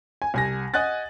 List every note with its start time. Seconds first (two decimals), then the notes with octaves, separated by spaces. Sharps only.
0.22 G#5
0.34 C2 G#5 A#6
0.74 D#5 F#5 G#5 F#6 A6